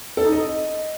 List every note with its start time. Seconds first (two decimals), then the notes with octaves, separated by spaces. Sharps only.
0.17 A4
0.25 D#4
0.32 D#5